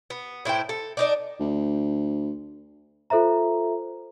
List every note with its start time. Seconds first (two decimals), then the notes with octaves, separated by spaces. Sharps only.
0.10 B3
0.45 A2 E4 C5 G5
0.69 A4
0.97 D4 D#4 D5
1.40 D2
3.10 F4 A4 C5 E5 A#5